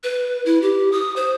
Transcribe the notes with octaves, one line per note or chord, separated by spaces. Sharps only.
B4
E4
G4
D#6
C5